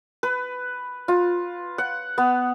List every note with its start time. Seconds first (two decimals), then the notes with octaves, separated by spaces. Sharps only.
0.23 B4
1.08 F4
1.78 F#5
2.18 B3